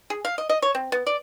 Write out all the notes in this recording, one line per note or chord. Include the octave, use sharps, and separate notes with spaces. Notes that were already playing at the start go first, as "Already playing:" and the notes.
G#4
F5
D#5
D#5
C#5
C4
B3
D5